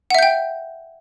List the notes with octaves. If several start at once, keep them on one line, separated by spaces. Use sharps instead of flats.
E5 F#5 G5 G6